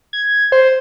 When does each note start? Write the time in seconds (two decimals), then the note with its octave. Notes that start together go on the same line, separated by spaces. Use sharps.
0.13 G#6
0.52 C5